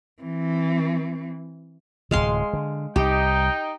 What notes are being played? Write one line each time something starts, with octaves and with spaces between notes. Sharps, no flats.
E3 C4
D1 C3 G#3 F5 C6
D3
C2 D#4 G4 G5